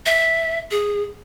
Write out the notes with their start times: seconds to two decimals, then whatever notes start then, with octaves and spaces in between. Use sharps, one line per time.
0.06 E5
0.71 G#4